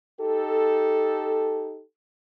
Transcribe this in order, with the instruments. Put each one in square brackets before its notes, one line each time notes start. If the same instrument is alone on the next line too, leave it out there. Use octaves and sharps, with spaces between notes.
[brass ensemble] D#4 G4 A4